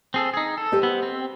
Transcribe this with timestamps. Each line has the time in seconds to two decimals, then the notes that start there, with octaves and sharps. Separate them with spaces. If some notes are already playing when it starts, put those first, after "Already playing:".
0.14 C4 G#4 A4
0.34 D#4 G#4
0.58 A4
0.72 G4 C5 D#5
0.83 B3
1.03 C4